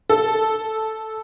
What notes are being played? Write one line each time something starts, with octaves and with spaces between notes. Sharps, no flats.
A4